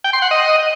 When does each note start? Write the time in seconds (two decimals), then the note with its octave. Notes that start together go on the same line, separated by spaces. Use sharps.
0.04 G5
0.13 C6
0.22 F#5
0.31 D#5